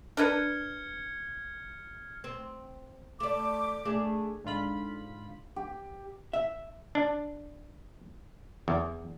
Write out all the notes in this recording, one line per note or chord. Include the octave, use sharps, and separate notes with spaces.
D4 A#4 B4 F6 G#6 C#7
C4
A3 D5 D6
A3 D4 G#4
G#2 D3 F4 B5
G4
E5
D4
E2